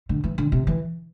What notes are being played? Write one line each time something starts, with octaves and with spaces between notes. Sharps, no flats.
D3
E3
D3
C3
E3